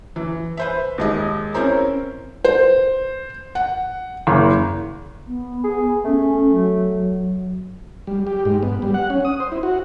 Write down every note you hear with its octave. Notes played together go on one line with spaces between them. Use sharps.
E3
B4 C5 E5
D#2 G#3 D#5
C4 C#4 E4 A#4 C5 A#5
C5
F#5
F#1
B3
G#4
A3 C#4
F#3
G3
G4
G#2
B3
G3
F#5
C#4
D#6
C5
E4
F#4